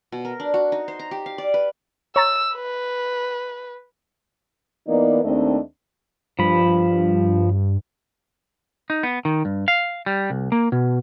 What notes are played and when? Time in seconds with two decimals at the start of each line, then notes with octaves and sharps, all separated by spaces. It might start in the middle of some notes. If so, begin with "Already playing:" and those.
0.12 B2
0.25 A#4
0.40 D4
0.54 F#4
0.72 D#4
0.88 C5
0.99 A#5
1.11 G4
1.26 F5
1.38 D5
1.54 B4
2.16 C#5 A#5 E6 A6
2.55 B4
4.88 E3 A#3 B3 D#4 D5
5.24 D#2 A3 C4 D4 D#5
6.39 G2 F3 B5
8.90 D#4
9.03 B3
9.25 D#3
9.45 G2
9.68 F5
10.06 G3
10.30 C2
10.52 A#3
10.72 B2